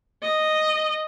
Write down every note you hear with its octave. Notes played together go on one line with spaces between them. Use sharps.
D#5